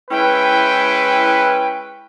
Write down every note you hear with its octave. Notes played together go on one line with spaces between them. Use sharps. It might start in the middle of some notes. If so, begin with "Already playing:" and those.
G#3 C#4 E4 B4 G5